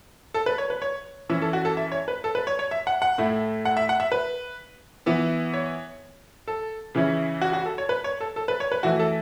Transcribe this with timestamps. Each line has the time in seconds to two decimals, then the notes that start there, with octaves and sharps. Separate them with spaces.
0.34 A4
0.46 B4
0.58 C#5
0.70 B4
0.82 C#5
1.29 E3 C#4 E4 E5
1.42 A4
1.53 F#4
1.65 A4
1.77 E5
1.92 C#5
2.08 B4
2.24 A4
2.35 B4
2.47 C#5
2.59 C#5
2.71 E5
2.87 F#5
3.02 F#5
3.18 A2 A3 E4
3.65 F#5
3.77 E5
3.89 F#5
4.00 E5
4.12 B4
5.06 E3 B3 E4
5.54 C#5
6.48 A4
6.95 C#3 E3 C#4 E4
7.42 F#4
7.53 F#4
7.66 A4
7.78 C#5
7.89 B4
8.04 C#5
8.21 A4
8.36 A4
8.48 B4
8.60 C#5
8.72 B4
8.83 E3 A3 E4 F#4
8.99 A4